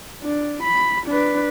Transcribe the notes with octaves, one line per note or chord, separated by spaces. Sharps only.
D4
B5
D4 B4